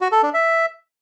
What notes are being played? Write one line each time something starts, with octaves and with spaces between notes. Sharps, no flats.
F#4
A4
D4
E5